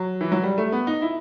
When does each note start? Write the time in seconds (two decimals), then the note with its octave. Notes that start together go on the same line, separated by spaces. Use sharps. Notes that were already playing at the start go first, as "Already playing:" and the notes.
Already playing: F#3
0.21 E3
0.32 F#3
0.43 G3
0.58 A3
0.72 B3
0.87 D#4
1.02 E4